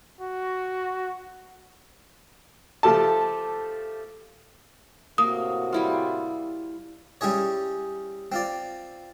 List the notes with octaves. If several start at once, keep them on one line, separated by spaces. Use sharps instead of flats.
F#4
F3 A3 G4 A4 A5
A2 C3 A#3 F#4 D#6
G3 E4 F4
G3 C#4 E4 G#4 C#5
C4 F4 D5